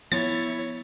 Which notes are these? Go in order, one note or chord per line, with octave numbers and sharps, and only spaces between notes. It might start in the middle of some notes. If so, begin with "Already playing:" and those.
F3 B3 E4 C#5 A6